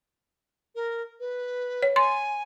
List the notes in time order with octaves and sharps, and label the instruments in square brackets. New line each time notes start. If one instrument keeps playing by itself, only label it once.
[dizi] A#4
B4
[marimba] C#5
[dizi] G#5 [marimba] C6